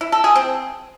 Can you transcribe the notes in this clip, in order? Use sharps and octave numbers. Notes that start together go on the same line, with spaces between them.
E4
A4
G#4
C4